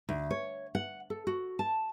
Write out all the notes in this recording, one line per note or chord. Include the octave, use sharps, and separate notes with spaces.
D2
C#5
F#5
A4
F#4
A5